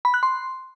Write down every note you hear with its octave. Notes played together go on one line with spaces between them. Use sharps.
B5
F#6
C6